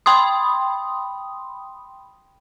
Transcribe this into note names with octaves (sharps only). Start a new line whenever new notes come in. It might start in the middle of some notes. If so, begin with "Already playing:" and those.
G5 B5 C6 D#6